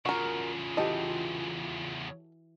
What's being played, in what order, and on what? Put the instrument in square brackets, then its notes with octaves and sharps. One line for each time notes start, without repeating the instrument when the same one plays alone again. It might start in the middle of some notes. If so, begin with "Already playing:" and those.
[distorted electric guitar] E2 C#3 [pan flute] F4 [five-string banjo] F#4 A#4
[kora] E3 F#4 G4 [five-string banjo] A4 D#5